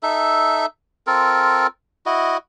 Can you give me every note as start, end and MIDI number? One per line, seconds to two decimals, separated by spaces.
0.03 0.66 63
0.03 0.66 69
0.03 0.66 76
1.07 1.67 60
1.07 1.67 65
1.07 1.67 69
1.07 1.67 70
2.06 2.37 64
2.06 2.37 66
2.06 2.37 75